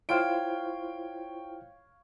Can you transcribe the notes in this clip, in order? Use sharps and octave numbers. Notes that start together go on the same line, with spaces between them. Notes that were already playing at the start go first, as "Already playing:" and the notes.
E4 F4 C5 C#5 F5 G5 D7